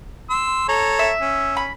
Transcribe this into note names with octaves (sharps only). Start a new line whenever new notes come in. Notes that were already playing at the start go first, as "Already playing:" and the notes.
C6 E6
A4 C#5 A#5
E5
C#4
B5